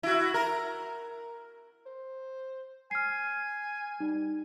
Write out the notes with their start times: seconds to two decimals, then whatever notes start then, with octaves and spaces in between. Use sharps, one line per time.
0.03 E4 F#4
0.34 A#4
1.86 C5
2.91 G#5 F6 C7
4.00 G3 D#4